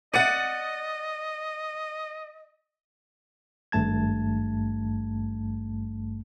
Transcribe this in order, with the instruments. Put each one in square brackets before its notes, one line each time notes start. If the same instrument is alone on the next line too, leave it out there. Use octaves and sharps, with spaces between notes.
[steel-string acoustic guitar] D5 F#5 [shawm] D#5 [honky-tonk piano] A6 C#7 D#7
[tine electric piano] G#1 G2 A3 A5 G#6